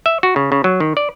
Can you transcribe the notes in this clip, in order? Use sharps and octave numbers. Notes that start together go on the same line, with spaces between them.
E5
F#4
C#3
C#3
F#3
D#3
D5